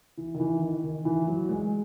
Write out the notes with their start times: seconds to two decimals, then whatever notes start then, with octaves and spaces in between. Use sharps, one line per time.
0.17 E3
0.34 D#3
0.40 E3
0.61 D#3
0.83 D#3
1.05 E3
1.27 F#3
1.49 G#3